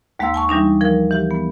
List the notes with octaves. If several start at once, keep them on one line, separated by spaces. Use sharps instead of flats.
D#2 G#3 A#3 F5 C6 E6
G#5 A5 C#6
E3 G3 D4 D#4
F3 A#4
E3 G4
B3